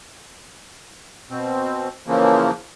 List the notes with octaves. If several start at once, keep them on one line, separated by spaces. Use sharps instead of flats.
B2 C4
C#3 E3 F3 A#3